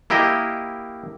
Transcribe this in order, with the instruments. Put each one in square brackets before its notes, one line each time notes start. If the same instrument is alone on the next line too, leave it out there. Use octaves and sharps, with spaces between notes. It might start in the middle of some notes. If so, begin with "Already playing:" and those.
[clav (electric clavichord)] A#3 E4 G4 A#4 D#5